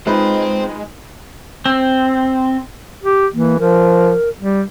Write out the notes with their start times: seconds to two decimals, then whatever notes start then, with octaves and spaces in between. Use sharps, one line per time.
0.07 G#3 C4 D#4 F4 B4 C5
1.66 C4
3.03 G4
3.34 E3 A#3
3.59 F3 A#4
4.41 G3